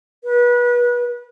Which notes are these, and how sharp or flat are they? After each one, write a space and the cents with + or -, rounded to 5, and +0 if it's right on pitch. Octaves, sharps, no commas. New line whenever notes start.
B4 -30